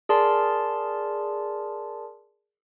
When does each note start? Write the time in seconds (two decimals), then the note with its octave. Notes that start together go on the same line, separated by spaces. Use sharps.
0.09 G#4 A#4 D5 A5 C6